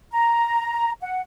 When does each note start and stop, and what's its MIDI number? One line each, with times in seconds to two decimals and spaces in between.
0.12 0.91 82
1.02 1.21 78